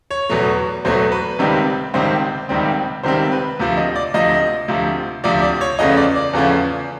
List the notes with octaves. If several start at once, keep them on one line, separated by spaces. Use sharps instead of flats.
C#5
E2 B2 F#3 A3
E2 B2 F#3 A3 C5
B4
C#2 C3 D#3 G3 C4
C#2 C3 D#3 G3 C4 C5
C#2 C3 D#3 G3 C4
C#2 C3 D#3 G3 C4 C5
B4
D2 C3 F3
D#5
D5
D2 C3 F3 D#5
D2 C3 F3
D2 C3 F3 D5
D5
C#5
E2 C#3 F3 A3 C#4 D#5
D5
D5
E2 C#3 F3 A3 C#4